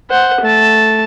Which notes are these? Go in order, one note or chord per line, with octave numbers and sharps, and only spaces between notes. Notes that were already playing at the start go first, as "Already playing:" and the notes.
C5 F#5
A3 A5